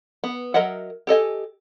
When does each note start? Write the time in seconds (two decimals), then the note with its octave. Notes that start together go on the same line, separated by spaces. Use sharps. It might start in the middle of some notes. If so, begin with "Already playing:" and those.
0.24 B3
0.54 F#3 A#4 D#5 E5 F#5
1.07 G4 A4 D#5 G#5